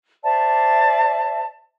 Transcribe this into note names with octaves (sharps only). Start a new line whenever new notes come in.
C5 D5 E5 A5